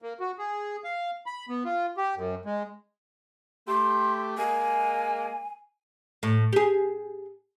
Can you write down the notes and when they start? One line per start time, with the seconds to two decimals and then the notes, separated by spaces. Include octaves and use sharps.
0.02 A#3
0.20 F#4
0.38 G#4
0.84 F5
1.26 B5
1.49 B3
1.65 F4
1.97 G4
2.16 F#2
2.45 G#3
3.68 A3 G4 C6
4.38 G#3 A#3 G#5
6.23 A2
6.53 G4 G#4